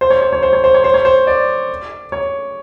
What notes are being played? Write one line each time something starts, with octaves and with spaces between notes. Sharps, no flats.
C5
C#5
C#5
C#5
C5
C#5
C5
C#5
C5
C#5
C5
D5
C#5